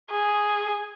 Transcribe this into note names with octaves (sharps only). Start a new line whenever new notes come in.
G#4